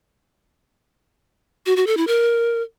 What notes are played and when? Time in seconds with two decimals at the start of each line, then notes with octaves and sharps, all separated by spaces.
1.66 F#4
1.76 F#4
1.87 A4
1.97 E4
2.07 A#4